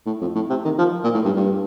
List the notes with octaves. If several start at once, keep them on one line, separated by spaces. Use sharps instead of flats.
A2
F2
A2
C3
D#3
F3
A#2
A2
G2
G2